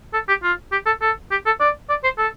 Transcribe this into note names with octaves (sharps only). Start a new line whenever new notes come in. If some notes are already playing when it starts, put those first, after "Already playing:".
A4
G4
F4
G4
A4
A4
G4
A4
D5
D5
C5
A4